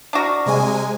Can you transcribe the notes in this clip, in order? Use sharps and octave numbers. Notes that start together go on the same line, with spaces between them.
D4 F#4 A#4
C3 G#3 G#5